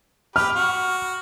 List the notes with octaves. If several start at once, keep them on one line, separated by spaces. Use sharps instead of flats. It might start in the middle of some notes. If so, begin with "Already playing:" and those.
G4 B4 F6
F#4